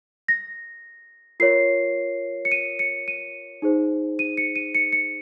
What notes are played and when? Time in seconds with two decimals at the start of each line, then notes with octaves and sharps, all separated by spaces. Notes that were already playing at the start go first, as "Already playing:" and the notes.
0.28 A#6
1.40 F4 A#4 C#5 C7
2.45 C#7
2.52 D#7
2.79 C#7
3.08 D#7
3.62 D#4 G#4 C5
4.19 D#7
4.37 C#7
4.56 D#7
4.75 C#7
4.93 C#7